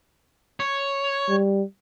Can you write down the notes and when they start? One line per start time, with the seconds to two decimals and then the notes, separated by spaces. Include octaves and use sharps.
0.60 C#5
1.29 G3